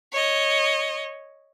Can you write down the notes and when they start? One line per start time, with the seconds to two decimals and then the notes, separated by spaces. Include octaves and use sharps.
0.12 C#5 D#5